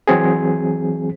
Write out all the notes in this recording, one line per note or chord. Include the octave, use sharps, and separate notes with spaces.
E3 F#3 C4 G#4